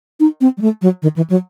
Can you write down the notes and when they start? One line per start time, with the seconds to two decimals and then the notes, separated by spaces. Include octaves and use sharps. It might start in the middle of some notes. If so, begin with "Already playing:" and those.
0.20 D#4
0.41 C4
0.57 G3
0.61 A3
0.82 F#3
1.02 D#3
1.16 E3
1.30 F#3